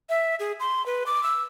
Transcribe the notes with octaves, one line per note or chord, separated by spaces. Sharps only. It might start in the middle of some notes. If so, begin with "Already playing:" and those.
E5
G#4
C6
B4
D6
E6